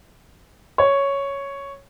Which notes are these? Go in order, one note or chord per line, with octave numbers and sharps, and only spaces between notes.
C#5